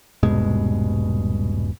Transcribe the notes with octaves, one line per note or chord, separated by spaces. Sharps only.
D#1 G2 B2 G#3